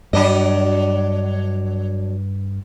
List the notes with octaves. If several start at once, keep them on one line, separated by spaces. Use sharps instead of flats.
G2 F#3 D4 D#5